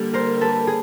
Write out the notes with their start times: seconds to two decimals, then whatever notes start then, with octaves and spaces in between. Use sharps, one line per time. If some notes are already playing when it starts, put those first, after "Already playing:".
Already playing: D3 G3 A#3
0.14 A#4 C5
0.41 A4 B4
0.67 G#4